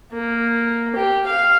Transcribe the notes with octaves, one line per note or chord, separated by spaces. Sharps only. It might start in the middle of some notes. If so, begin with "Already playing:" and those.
A#3
G4
F5